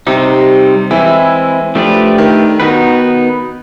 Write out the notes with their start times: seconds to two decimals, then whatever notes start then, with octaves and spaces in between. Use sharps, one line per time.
0.07 C3 G3 C4 D#4
0.91 E3 G#3 C4 E4
1.75 F3 A3 D4 G4 B4 D5
2.18 D#3
2.60 D#3 B3 D#4 F#4 B4